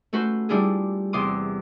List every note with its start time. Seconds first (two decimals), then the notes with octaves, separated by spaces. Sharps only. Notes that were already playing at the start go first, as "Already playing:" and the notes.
0.13 A3 C#4 F#4 B4 C5
0.49 G3 D4 E4 F4 G#4
1.13 E2 C3 C6 D6 D#6